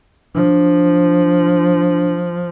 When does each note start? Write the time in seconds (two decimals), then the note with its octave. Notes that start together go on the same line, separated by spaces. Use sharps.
0.35 F3 D4